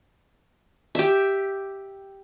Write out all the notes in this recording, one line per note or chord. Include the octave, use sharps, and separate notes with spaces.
G4 E5